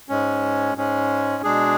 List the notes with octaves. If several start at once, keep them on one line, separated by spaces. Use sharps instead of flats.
G#2 G#3 C#4
G#2 G#3 C#4
B2 G#3 D4 G#4